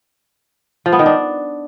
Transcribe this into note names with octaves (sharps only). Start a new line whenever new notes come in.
F3
B3
D#3
D4